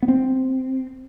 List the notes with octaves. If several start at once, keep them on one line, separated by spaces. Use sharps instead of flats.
B3
C4